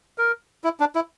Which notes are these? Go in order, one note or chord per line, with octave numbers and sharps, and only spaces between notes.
A#4
E4
D4
E4